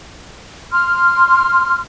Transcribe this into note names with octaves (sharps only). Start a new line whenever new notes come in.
C6 F6